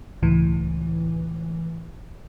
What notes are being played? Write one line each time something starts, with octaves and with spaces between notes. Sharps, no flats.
C#2 A2 E3